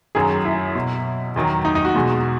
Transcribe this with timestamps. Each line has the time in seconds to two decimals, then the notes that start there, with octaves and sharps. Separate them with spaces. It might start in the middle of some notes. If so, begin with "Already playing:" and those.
0.15 F#2 D#3 F#3 G#4
0.45 E4
0.75 B2 F#3
1.36 E2 D#3 F#3
1.65 D#4
1.75 D#4
1.85 F#4
1.95 E2 B2 G#3